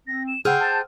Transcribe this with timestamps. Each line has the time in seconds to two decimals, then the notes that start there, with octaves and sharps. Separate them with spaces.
0.07 C4 A#6
0.28 E7
0.45 C#3 G#4 C5 F#5 G5 E6 F6 G6
0.60 A5